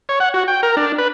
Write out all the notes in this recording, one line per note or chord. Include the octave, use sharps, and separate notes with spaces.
C#5
F#5
F#4
G5
A#4
D4
B4